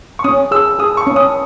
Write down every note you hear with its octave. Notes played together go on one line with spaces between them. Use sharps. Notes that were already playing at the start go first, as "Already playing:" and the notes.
C#6
C#4 D#6
G#4 E6
G#4 D#6
C#6
C#4
D#6